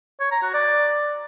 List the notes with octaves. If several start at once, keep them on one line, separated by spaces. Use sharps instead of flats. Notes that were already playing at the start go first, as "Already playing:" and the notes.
C#5
A#5
F#4
D5